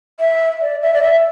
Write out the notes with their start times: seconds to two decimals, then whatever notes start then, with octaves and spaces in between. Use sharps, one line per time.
0.20 E5
0.61 D5
0.82 E5
0.94 D5
1.02 E5